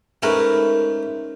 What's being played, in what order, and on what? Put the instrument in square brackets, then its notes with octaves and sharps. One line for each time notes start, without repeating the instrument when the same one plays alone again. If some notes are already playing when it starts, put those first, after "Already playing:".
[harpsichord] G#2 A3 [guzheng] C#4 A#4 B4